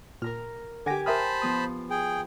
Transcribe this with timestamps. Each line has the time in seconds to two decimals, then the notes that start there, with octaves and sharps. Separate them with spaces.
0.22 A#2 A#4 A#5 F6
0.86 D3 G4 F#5 G#5 D6 A#6
1.06 A#4 C5 E5 A5 B5 D#6 F6
1.42 F3 B3 D#6
1.91 G#4 G5